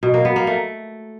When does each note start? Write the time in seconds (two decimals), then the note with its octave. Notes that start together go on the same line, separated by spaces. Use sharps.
0.03 B2
0.14 A#3
0.25 B3
0.36 A#3
0.47 A3